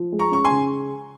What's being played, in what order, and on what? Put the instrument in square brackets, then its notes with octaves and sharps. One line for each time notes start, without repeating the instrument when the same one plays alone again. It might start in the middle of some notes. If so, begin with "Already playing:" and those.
Already playing: [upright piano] F3
G#3
[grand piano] A#5 C#6
[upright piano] C#4 [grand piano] C#6
[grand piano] G#5 C6
[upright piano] C#3